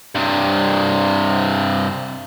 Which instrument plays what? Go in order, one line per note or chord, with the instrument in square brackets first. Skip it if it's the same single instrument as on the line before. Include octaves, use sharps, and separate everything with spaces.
[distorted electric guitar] G2 C3